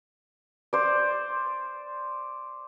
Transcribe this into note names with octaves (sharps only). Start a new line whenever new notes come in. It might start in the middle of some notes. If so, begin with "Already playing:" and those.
C5 D5